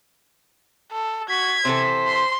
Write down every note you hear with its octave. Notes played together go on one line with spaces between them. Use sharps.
A4
F#4 G#6 B6
C3 E3 A4 C5
C6